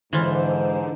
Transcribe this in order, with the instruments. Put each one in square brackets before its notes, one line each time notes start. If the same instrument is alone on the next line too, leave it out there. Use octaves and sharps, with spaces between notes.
[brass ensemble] G#2 [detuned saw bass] D3 [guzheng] E3 F4 [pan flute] C5